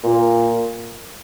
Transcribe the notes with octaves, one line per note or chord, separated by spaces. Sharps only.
A#2